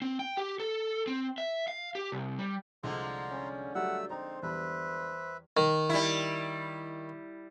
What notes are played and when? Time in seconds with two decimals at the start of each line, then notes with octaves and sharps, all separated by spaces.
0.02 C4
0.19 G5
0.37 G4
0.60 A4
1.07 C4
1.38 E5
1.68 F5
1.95 G4
2.12 C2
2.39 G3
2.83 C2 D3 F3 G#3 A#5 C6
3.31 C#4
3.75 F#3 G3 A3 F#5 E6
4.10 C4 D#4 C5 A#5
4.43 E2 G3 B4 E5 B5
5.57 D#3
5.89 G3 E4